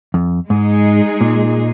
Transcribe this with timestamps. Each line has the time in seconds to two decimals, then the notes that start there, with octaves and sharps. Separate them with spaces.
0.14 F2
0.49 G#2 G#3 D#4 G#4
1.21 A#2